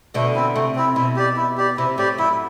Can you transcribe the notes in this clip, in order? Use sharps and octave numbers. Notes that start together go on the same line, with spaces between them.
B2 D3 A3
C4 E4
C3 A3
C4 E4
B2 E4
G4 D5
E4
G4 D5
C3 E4
A2 G4 D5
F#2 E4